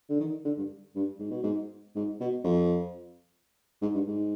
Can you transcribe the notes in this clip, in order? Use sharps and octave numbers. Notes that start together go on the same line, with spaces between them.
D3
D#3
D3
G2
G2
G#2
B2
G#2
G#2
B2
F2
G#2
G2
G#2